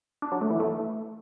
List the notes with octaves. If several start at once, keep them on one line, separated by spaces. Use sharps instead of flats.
D4
F#3
A3
E3
A3